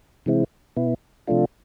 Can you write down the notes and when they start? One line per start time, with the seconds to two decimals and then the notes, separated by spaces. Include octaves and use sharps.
0.26 C3 E3 G#3 C4 E4
0.76 B2 B3 E4
1.27 C3 F3 A3 D4 F4